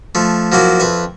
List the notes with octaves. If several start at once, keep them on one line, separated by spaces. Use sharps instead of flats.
F3 A3
F3 F#3 A#3 E4
F2 B4 E5